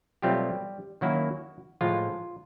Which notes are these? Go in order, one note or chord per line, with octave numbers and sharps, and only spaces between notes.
B2 F#3 G3 A3 C4 F4 G4
D#3 F#3 A#3 C#4 E4 F#4
A2 F3 G#3 F4